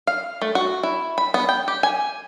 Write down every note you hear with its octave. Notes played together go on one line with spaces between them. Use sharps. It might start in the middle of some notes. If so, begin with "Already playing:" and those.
F5
A3
F#4
E4
B5
B3
G5
G4
G#5